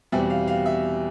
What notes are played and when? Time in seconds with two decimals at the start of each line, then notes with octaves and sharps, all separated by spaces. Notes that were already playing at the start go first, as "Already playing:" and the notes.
0.12 E2 B2 G3 C4 E5
0.30 F5
0.48 F5
0.66 E5